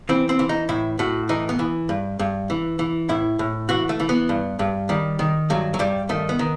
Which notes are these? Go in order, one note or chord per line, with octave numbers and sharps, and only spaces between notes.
E3 C4
C4
E3
D#4
A2 E4
A2 F#4
E3 D#4
B3
E3
G2
G2
E3
E3
A2 E4
A2
E3 F#4
A3
E3
B3
G2
G2
D#3 G3
D#3
G2 F#3
F#3
G2 G3
D#3 A3
B3
D#3